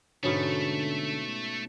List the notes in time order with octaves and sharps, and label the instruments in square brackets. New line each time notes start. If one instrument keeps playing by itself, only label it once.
[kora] G#2 B2 C#4 [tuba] D3 [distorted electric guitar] A3